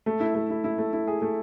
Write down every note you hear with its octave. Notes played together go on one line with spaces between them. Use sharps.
A3
E4
A3
E4
E4
A3
E4
G#4
A3